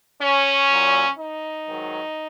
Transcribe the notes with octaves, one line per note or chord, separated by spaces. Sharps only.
C#4
A#2 F#3
D#4
G#2 D#3 F#3